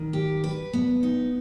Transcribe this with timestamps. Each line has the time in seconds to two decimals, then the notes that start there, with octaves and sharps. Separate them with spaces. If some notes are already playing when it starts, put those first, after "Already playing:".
Already playing: D#3
0.13 G4
0.44 B4
0.73 B3
1.03 D#4